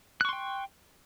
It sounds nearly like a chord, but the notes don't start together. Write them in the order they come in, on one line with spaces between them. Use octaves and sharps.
F#6 C#6 C6 G5